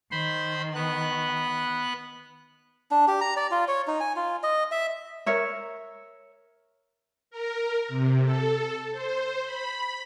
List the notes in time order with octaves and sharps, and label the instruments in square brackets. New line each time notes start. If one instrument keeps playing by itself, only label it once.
[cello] D#3 [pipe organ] C5 B5 C6
[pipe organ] B3 F#6
[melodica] D4
G4
A#5
D5
F4
C#5
D#4
G#5
F4
D#5
E5
[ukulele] A#4 C#5 E5
[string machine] A#4
C3
A4
C5
B5